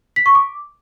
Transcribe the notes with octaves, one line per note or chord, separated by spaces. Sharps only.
B6
C#6
D6